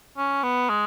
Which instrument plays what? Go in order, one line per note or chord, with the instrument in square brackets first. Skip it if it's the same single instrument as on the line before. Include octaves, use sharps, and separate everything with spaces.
[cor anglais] C#4
B3
G#3